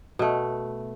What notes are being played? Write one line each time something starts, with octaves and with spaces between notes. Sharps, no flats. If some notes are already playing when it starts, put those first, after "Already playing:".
B2 A3